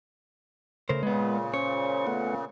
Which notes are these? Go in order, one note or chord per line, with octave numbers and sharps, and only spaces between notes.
C#3 A3 A#4 C5
A#2 C#3 G#3 B3 B4
C#4 C5 C#5 C#6
A3 B3 F#5